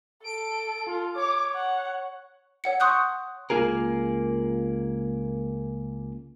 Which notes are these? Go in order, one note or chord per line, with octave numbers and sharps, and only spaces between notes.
A4 D7
F4
C#5 D6
F#5
C#5 F#5 C#7
C6 C#6 D#6 F#6 G6
C#2 C#3 A#3 F4 G#4 A#4